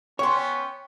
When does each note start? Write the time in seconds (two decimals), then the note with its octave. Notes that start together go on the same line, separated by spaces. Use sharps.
0.19 B3 C#4 C#5 G5 C6 C#6